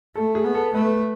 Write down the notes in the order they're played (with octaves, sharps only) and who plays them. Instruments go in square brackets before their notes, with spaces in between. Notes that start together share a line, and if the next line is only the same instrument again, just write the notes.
[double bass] A3 [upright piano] A4
[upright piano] G#4
[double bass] B3
[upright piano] A4
[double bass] A3 [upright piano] B4